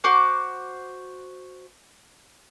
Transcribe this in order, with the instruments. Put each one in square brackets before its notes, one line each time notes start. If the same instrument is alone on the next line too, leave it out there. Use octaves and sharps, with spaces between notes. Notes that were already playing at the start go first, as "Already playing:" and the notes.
[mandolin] F#4 C5 D6